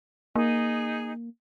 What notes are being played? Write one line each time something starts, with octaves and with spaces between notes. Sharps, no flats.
A#3 D#4 G#4